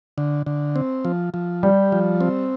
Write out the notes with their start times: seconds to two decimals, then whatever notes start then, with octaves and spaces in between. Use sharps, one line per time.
0.18 D3
0.46 D3
0.76 C4
1.05 F3
1.34 F3
1.63 G3 G4
1.92 F3
2.21 C4